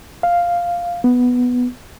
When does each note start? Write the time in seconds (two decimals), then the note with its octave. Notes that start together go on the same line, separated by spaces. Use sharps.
0.23 F5
1.04 B3